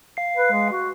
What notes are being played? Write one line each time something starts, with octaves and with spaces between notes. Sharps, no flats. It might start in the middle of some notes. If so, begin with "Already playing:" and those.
F5 C7
B4
G#3
F#4